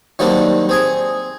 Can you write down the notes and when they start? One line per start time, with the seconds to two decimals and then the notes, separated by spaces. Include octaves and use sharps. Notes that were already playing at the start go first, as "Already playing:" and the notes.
0.19 D#3 F#3 G3 A#3 C4 D4
0.69 C4 G#4 G#5